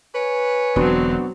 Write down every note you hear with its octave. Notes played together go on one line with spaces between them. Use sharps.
B4 C#5 G#5
E1 D3 F#3 B3 C4 D4 F#4